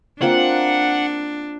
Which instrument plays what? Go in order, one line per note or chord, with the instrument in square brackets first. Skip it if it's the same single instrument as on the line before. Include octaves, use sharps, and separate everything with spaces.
[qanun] A#3 C4 F4 [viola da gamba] D4 [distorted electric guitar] F#5